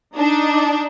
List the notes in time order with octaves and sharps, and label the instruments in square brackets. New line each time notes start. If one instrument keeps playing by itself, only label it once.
[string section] D4 [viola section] D#4